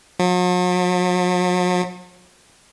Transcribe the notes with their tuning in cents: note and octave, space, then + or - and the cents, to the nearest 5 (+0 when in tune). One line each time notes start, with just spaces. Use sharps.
F#3 -45